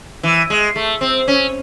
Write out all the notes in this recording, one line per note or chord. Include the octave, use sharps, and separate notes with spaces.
E3
G#3
A3
C4
C#4